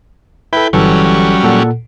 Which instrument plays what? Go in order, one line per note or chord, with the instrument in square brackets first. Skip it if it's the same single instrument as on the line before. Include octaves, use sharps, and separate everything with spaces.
[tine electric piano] E4 A4 [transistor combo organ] B4 G5
[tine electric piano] G1 E3 A4 [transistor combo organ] F#3 G3 C#4
[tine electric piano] A#2 A4 F#5